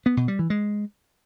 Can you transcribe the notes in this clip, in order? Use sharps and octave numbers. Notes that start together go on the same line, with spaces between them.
B3
B2
G3
E3
G#3